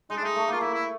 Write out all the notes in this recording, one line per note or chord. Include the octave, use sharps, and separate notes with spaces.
G#3 D#4
D4
A3 D#4
A3
A#3 F4
A3 E4
E4